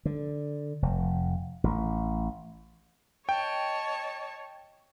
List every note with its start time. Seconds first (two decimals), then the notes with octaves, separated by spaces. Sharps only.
0.05 D3
0.82 F1
1.64 A1
3.29 C#5 D#5 G5 A5